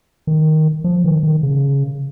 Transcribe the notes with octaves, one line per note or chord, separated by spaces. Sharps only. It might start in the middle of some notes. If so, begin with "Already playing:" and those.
D#3
F3
D#3
D#3
C#3